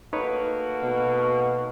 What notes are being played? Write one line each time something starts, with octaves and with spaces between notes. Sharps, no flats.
A3 A#3 D#4 F#4 B4 C#5
B2